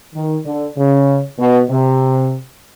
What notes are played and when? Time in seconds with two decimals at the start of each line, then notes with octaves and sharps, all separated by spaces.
0.14 D#3
0.45 D3
0.76 C#3
1.39 B2
1.69 C3